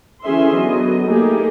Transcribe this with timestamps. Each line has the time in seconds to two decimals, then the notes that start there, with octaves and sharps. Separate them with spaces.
0.24 D3 E3 C#4 G#4 E5 C6
0.54 D3 F#3 B3 D#5
1.06 A3 A#3 D#4 G4 G#4